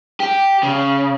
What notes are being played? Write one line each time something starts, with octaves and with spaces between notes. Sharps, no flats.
G4
C#3